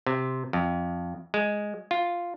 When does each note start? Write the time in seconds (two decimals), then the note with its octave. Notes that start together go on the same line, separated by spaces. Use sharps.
0.07 C3
0.53 F2
1.34 G#3
1.91 F4